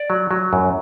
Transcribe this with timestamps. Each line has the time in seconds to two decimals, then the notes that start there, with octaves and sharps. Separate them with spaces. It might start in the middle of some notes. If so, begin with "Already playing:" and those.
Already playing: D5
0.10 F#3
0.31 F#3
0.53 F#2